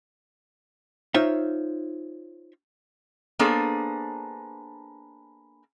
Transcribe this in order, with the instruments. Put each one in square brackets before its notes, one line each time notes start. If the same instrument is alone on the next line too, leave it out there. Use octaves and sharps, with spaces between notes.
[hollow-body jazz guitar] D#4 F4 C5 C#5 E5
[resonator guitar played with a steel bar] A#3 B3 D4 G#4 A4 C5